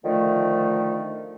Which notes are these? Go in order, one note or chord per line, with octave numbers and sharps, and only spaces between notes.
D3 D#3 F3 A3